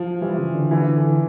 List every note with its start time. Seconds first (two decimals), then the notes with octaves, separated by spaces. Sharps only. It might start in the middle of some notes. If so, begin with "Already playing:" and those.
Already playing: F3
0.21 E3 G3
0.38 C#3
0.54 D3
0.70 D3 E3
0.95 D3